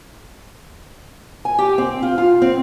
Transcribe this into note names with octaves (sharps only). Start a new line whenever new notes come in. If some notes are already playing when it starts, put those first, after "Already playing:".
G#5
G4
C4
F4
F4
C4